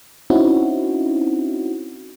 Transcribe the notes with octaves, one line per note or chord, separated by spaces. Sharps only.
C4 C#4 D#4 E4 F#4